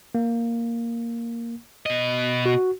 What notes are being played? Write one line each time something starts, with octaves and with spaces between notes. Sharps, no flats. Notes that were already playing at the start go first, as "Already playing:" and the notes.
A#3
B2 D#5
F#4